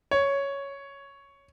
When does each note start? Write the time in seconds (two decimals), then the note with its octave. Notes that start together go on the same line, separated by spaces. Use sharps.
0.11 C#5